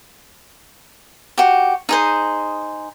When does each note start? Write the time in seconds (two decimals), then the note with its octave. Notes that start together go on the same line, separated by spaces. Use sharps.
1.38 F#4 G4
1.89 D#4 G#4 C5